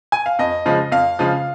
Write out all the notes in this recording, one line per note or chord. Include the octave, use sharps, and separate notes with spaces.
G#5
F5
F2 D#5
C#3 F3 G#3
F2 F5
C#3 F3 G#3